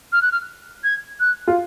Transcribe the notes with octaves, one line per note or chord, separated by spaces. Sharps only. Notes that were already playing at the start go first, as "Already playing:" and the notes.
F6
F#6
F6
G#6
F#6
F4